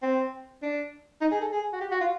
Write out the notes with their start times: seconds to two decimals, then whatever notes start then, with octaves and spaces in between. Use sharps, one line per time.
0.03 C4
0.62 D4
1.21 D#4
1.32 G#4
1.41 A4
1.51 G#4
1.73 F#4
1.81 G4
1.91 F#4
2.01 F4